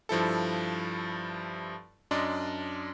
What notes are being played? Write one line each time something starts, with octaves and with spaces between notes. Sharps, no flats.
G2 F3 E4 A4
F#2 D4 D5 D#5 C6